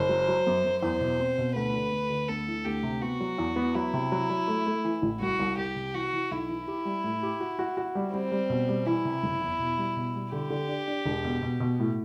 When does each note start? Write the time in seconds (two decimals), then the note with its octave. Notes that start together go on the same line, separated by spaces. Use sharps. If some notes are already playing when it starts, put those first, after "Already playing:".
Already playing: F#1 C5
0.09 F#3
0.28 F#3
0.47 F#2
0.65 F#2
0.83 E2 C5
1.01 B2
1.20 C4
1.38 B2
1.56 D2 B4
1.74 D3
1.92 D2
2.10 D3
2.28 D2 A4
2.48 E3
2.65 D2 G4
2.83 C3
3.02 B3 F#4
3.21 F#3
3.38 E2
3.56 B3
3.75 F#3 E4
3.94 C3
4.12 F#3
4.30 F#3
4.48 A3
4.66 A3
4.85 E3
5.02 A1
5.21 C2 F#4
5.40 C2
5.58 C2 G4
5.76 C3
5.94 E3 F#4
6.13 E3
6.31 B1 E4
6.49 E3
6.68 G4
6.85 G3
7.04 A2
7.23 G4
7.40 F#4
7.59 F#4
7.77 F#4
7.95 G3
8.13 G3 C4
8.32 G3
8.50 B2
8.69 G3
8.86 E3 E4
9.05 C3
9.23 F#1
9.41 E2
9.60 B2
9.78 G3
9.96 B2
10.15 G3
10.32 D3 G4
10.50 D3
10.69 D4
10.88 D4
11.05 E1
11.24 B2
11.42 B2
11.60 B2
11.79 A2